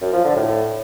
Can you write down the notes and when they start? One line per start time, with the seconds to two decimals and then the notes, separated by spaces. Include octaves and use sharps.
0.01 F#2
0.13 F3
0.24 D3
0.36 A2